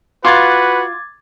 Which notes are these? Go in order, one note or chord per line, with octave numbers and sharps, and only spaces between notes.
F4 F#4 B4 D6 G#6 A6